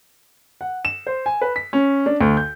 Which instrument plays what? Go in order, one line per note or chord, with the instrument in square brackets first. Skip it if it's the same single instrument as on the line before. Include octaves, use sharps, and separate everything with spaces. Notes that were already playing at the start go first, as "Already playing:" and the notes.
[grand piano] F#5
E7
C5
G#5
B4
B6
C#4
D4
D2
G6